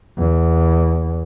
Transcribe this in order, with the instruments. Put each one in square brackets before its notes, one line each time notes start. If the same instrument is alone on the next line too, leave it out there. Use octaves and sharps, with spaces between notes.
[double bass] E2